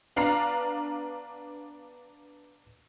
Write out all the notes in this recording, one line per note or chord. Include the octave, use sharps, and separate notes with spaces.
B3 D4 F5 A#5 C7